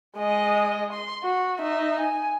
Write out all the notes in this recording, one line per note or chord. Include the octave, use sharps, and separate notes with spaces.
G#3 D#5
C6
F#4
D#4 E5
G#5